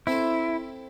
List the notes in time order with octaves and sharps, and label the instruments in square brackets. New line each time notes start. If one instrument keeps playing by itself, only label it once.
[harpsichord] C4 A4 C5 [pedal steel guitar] E4